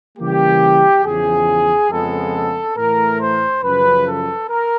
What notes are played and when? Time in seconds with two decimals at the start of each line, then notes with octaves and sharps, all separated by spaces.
0.18 C#3 E3 G3 A#3 G4
1.04 E2 C#3 F3 G#4
1.90 F2 C#3 F3 G#3 B3 A4
2.76 A2 E3 A3 A#4
3.19 C5
3.63 F#2 C#3 F3 B4
4.06 A4
4.48 A#4